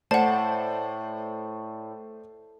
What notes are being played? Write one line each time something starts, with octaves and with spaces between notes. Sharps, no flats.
A2 A3 C5 D5 F#5 A5